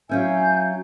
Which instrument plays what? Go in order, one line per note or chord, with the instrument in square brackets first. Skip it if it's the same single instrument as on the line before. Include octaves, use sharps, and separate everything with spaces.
[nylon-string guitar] F#3 C#4 E4 [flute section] F5 G#5 G6